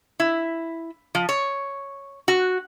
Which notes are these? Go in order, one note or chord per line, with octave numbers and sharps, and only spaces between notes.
E4
F3
C#5
F#4